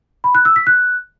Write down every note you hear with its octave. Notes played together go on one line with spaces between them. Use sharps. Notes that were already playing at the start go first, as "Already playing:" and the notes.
B5
F#6
E6
B6
F#6